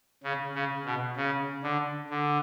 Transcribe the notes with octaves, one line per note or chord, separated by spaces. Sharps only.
C#3
C#3
B2
C#3
D3
D3